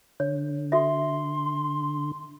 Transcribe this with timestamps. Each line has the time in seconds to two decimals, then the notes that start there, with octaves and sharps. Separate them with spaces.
0.20 D3 C#5
0.72 F#4 A4 E5 C6